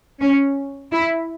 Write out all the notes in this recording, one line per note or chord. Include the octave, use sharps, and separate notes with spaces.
C#4
E4